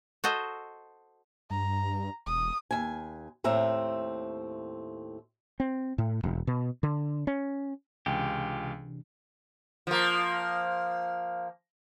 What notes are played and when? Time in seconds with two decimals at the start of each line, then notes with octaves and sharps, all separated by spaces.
0.24 F#4 A4 C5 D#5
1.50 G2 A#5
2.26 E1 D#6
2.71 D#2 G#5
3.44 D#2 A2 C4 E5 A#5
5.60 C4
5.98 A2
6.23 E1
6.47 B2
6.83 D3
7.27 C#4
8.06 C#2 C3 E3 D4 F4 G4 G5 G#5
9.87 F3 A#3